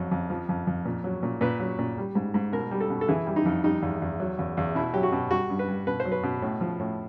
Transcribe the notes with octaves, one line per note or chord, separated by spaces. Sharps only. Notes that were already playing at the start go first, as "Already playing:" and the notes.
Already playing: F2 F#3
F2
F3
F2
F2
A#2
F#3
A#2
A#2 B4
F#3
A#2
G3
G#2
G#2
B2 A#4
G3
A4
B2
A4
E3 G#4
G3
D#4
F2
G3 D#4
E2
E2
F#3
E2
E2
B2 E4
F#3 G4
F#4
B2
G3 F#4
G2
B4
G2
B2 B4
C5
F#3
B4
B2
A2
F3
A2